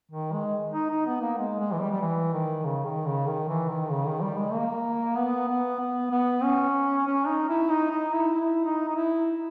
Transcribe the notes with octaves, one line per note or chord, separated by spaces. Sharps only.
D#3
G#3
D#4
D#4
B3
A#3
G#3
G#3
E3
G3
G3
E3
D#3
C#3
D#3
C#3
D#3
E3
D#3
C#3
D#3
G3
G#3
A#3
B3
B3
B3
B3
C#4
C#4
D#4
E4
D#4
D#4
E4
E4
D#4
D#4
E4